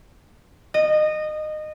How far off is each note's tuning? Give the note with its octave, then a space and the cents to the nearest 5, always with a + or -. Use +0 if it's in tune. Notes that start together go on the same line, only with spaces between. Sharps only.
D#5 -20